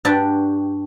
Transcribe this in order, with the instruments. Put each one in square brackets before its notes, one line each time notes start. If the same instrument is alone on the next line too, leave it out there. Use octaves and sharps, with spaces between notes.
[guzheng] G2 D4 F#4 G4 D5 A5